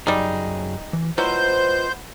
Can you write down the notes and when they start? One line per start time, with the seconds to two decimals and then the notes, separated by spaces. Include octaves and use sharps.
0.07 F#2 F#3 G3 D#4 G#4
0.93 E3
1.18 F#3 E4 F4 B4 C5 D#5 G6